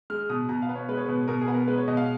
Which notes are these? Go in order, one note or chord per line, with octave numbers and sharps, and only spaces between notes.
G#3 F6
B2 D#6
B2 A#5
F5
B3
C#5
G#3 B4
C#5
B2 B4
B2 A#4
G#4
B3
A#4
G#3 B4
C#5
B2 D#5
F5